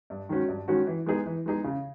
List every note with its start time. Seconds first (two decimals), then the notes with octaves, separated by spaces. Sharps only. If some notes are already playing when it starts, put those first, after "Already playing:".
0.10 G2
0.29 D#3 G#3 C#4 F#4
0.48 G2
0.68 D#3 G#3 C#4 F#4
0.87 E3
1.06 G#3 B3 D#4 G#4
1.26 E3
1.46 G#3 B3 D#4 G#4
1.64 C#3